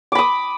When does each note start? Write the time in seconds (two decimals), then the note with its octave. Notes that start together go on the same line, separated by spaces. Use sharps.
0.12 D6
0.15 B5
0.19 D#6